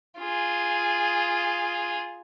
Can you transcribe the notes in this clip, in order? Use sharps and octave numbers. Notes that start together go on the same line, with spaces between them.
F4 G#4